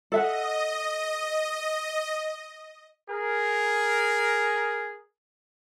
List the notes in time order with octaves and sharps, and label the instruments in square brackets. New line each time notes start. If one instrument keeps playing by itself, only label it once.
[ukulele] A4 E5 F#5 [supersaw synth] D#5
[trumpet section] G#4 A#4